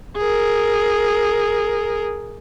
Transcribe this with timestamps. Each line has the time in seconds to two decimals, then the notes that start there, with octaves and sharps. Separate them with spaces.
0.17 G#4 A#4